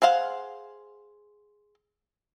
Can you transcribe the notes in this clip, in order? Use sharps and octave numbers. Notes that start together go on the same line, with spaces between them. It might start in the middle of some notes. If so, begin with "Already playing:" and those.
G#4 C5 F5 F#5